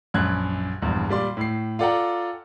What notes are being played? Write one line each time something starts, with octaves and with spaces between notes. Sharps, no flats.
A#1 F#2 F#6 G#6
A#1 E2 G2
A#2 G3 D5 C6
A2 C7
F4 A4 D5 F#5 G5 A#5